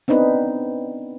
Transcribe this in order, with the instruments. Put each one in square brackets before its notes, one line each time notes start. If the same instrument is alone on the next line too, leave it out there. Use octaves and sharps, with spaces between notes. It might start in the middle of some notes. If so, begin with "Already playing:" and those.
[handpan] B3 C4 D4 D#4 B4